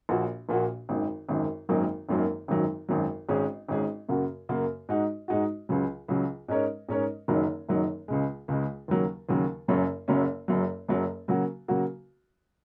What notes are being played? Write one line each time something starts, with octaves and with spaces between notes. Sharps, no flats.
A#1 A#2 A#3 F#4
A#1 A#2 A#3 F#4
G#1 F#2 D#3
G#1 F#2 D#3
G#1 F#2 D#3 F#3 A#3
G#1 F#2 D#3 F#3 A#3
G#1 F#2 D#3 F#3
G#1 F#2 D#3 F#3
G#1 G#2 G#3 C#4 G#4
G#1 G#2 G#3 C#4 G#4
F#2 C#3 A#3 F#4
F#2 C#3 A#3 F#4
G#2 G#3 D#4 F#4
G#2 G#3 D#4 F#4
C#2 C#3 F#3
C#2 C#3 F#3
G#2 G#3 C#4 A#4 C#5
G#2 G#3 C#4 A#4 C#5
F#1 F#2 D#3 F#3 D#4
F#1 F#2 D#3 F#3 D#4
C#2 C#3 G#3
C#2 C#3 G#3
D#2 C#3 F#3 A#3
D#2 C#3 F#3 A#3
F#1 F#2 C#3 F#3 C#4
F#1 F#2 C#3 F#3 C#4
F#1 F#2 F#3
F#1 F#2 F#3
C#3 F#3 A#3 F#4
C#3 F#3 A#3 F#4